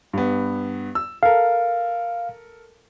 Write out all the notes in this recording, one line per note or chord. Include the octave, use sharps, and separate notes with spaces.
G2 B3
E6
A4 A#4 F5